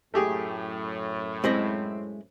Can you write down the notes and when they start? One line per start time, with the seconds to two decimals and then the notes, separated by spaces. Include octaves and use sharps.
0.14 F#2 A2 A3 G4 G#4
1.44 G#3 C4 E4 D#5